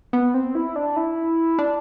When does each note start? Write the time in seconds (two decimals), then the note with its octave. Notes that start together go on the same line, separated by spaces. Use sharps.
0.13 B3
0.34 C4
0.55 E4
0.76 D4
0.96 E4
1.59 D4